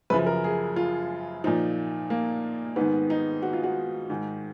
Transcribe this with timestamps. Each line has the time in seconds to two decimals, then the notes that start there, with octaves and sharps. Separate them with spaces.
0.10 F#2 C#3 F3 B4
0.26 A#4
0.44 G#4
0.76 F4
1.44 A#2 F3 D#4
2.10 A#3
2.76 G#2 D#3 B3
3.10 D#4
3.42 F#4
3.53 F4
3.64 F#4
4.10 G#2 D#3